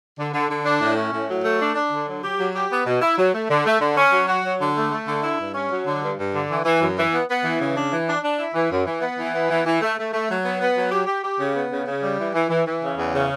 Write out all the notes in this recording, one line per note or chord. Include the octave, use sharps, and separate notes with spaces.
D3
D3
D3
D4
A2
C#4
A2
F#3
A3
D4
D4
D3
F#3
G4
F#3
G4
B3
B2
E4
F#3
A3
D3
A3
D3
C#4
F#3
F#4
F#3
D3
A3
A3
D3
E4
G2
C#4
F#3
D3
G2
G2
D3
E3
E3
F#2
E3
B3
B3
E3
C#3
D4
E3
D4
D4
E4
E3
F#2
E3
B3
E3
B3
E3
E3
A3
A3
A3
F#3
B3
B3
F#3
G4
G4
G4
C#3
B3
C#3
C#3
G3
E3
E3
E3
E3
C#3
E2
C#3